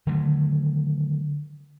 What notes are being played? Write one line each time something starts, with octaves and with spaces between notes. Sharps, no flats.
D3 D#3 F#3 A3